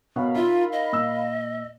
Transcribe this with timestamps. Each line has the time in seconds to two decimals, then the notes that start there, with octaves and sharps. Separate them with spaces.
0.16 B2 A#4 C#5 F5 F#5 B5
0.36 D#4 F4 E5
0.73 D#5
0.92 A#2 E6